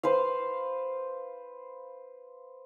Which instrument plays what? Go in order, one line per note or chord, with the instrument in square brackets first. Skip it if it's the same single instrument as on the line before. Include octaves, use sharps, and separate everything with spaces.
[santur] B4 C5 F5